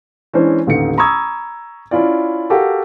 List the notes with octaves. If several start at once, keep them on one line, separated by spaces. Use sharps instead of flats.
E3 G#3 C#4 D4 C5
A1 D#2 D3 D#4 C#7
A#5 B5 C#6 D#6 E6 G#6
C#4 E4 F4 D5
F#4 G4 A4 A#4 F5 F#5